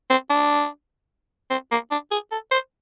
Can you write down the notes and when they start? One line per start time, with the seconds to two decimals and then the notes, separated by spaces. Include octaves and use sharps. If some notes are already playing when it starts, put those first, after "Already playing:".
0.10 C4
0.30 D4
1.50 C4
1.71 A#3
1.91 D4
2.11 G#4
2.32 A4
2.51 C5